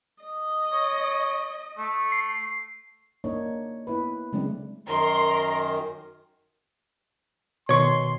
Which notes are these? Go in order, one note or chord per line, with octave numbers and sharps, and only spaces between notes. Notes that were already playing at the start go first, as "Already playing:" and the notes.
D#5
C#5
A3
C7
A#3 D4 D#4 C#5
B3 E4 B4
C#3 F#3 G#3 A3 C4 D4
F#2 D#3 A#4 C6
B2 D#3 C#5 C6 C#6